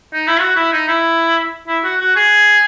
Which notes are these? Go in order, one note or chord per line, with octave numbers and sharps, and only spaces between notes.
D#4
E4
F#4
E4
D#4
E4
E4
F#4
F#4
G#4